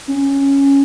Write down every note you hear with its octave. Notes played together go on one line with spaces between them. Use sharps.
C#4